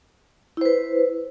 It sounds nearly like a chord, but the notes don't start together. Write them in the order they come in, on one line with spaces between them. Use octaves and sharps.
E4 C5 B4